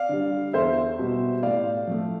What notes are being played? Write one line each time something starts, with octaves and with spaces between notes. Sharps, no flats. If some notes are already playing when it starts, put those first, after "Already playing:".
Already playing: D5 F5
D3 G3
E2 C5 E5
B2 G3
A2 D5 F5
F3 A3